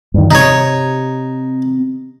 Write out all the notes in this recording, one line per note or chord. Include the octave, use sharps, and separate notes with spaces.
G2 D#3
C3 D#4 C#5